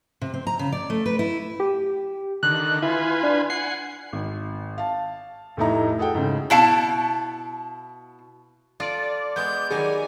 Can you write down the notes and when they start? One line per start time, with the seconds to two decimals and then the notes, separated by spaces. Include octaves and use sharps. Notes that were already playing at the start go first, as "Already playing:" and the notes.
0.22 C3
0.34 C4
0.47 A#5
0.59 C#3
0.72 D5
0.90 A3
1.06 B4
1.19 E4
1.60 G4
2.43 D3 D#3 F#6
2.82 E4 F4 B4 G#5
3.23 D4
3.50 F#5 G#5 C7
4.13 G#1
4.78 F5 A5
5.57 F1 A2 A3 D#4 E4 A#5
5.98 F#4 G#4 A4 F#5 G5
6.15 G#2 C#3
6.50 B2 E4 F5 A5
8.80 F4 A4 D5
9.36 G#3 B3 G6
9.71 D#3 F#3 G3 G#4 G#5